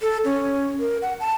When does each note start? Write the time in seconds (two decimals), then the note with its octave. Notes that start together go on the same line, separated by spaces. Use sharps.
0.02 A4
0.25 C#4
0.80 A#4
1.02 F#5
1.20 A5